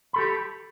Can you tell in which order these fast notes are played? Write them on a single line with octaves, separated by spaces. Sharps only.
B5 A4 G4